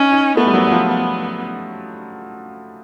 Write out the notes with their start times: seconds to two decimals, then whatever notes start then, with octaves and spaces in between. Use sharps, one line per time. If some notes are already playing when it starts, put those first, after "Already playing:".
Already playing: C#4 D#4
0.12 D#4
0.37 A3 B3
0.47 G3
0.54 F#3
0.67 F#3
0.71 F3
0.88 B3